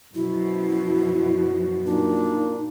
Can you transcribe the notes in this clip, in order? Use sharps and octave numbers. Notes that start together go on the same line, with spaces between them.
F#2 B2 F3 E4 F#4
A#2 D4 D#4